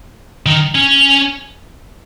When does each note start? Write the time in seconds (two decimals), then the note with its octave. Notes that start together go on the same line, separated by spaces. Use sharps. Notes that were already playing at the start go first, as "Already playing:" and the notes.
0.46 D#3
0.75 C#4